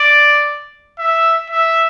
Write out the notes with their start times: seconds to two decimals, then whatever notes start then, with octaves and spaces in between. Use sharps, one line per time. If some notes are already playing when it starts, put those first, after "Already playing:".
Already playing: D5
0.99 E5
1.50 E5